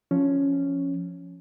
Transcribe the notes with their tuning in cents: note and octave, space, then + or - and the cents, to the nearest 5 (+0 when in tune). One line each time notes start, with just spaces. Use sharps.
F3 +0 C#4 +0